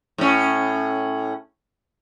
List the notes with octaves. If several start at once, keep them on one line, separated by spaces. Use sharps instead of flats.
A2 C#4